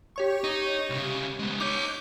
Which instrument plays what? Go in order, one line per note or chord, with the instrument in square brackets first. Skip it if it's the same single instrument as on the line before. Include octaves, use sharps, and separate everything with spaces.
[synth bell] G4 C#5 C#6
[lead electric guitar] D#4
C2 C#3
G#3 B3
[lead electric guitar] D#4 C#5 [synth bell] D6 G6